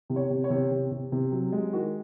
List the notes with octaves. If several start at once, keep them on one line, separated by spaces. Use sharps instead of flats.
C3
C#5
C3
C#5
C3
C3
C3
C3
F#3
G#3
D#3 F#4